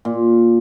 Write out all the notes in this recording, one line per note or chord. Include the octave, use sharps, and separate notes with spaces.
A#2